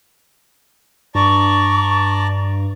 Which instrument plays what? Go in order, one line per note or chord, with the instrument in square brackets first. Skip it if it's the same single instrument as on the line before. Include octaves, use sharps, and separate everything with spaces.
[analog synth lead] G2 [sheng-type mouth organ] D5 A5 A#5 [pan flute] C#6